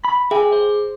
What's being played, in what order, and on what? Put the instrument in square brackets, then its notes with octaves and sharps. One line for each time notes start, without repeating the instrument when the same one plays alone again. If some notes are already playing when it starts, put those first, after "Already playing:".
[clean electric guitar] B5
[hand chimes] G#4 [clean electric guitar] E5 G5 G#5
[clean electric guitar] C5